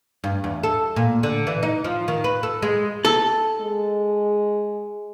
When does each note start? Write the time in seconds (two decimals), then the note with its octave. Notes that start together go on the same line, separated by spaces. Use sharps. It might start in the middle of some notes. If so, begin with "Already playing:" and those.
0.24 G2
0.44 E2
0.63 A4
0.96 A#2
1.23 D3
1.47 E3
1.63 D#4
1.84 F3
2.08 D#3
2.24 B4
2.43 A4
2.62 G#3
3.05 A4
3.61 G#3